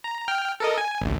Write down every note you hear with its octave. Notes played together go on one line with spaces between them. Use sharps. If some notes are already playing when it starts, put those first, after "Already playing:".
A#5
G5 F6
A4 A#4 D#5
G#5
A1 D2